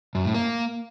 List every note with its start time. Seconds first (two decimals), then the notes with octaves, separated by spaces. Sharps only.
0.15 F#2
0.25 A2
0.34 A#3